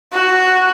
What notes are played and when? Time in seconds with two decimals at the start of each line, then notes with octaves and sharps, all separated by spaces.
0.13 F#4